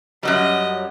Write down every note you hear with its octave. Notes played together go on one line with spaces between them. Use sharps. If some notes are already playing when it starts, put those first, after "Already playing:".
F#2 F#3 G3 D#5